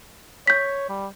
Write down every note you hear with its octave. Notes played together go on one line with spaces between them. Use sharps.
C#5 G6 B6
G3